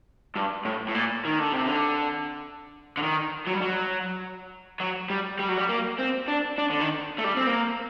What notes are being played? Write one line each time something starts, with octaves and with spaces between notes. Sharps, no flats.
G2
A2
A2
A#2
D#3
D3
C3
D3
D3
D#3
F#3
G3
F#3
F#3
G3
G3
F#3
G3
A#3
C4
D4
D4
D3
D#3
A3
G3
C4
A#3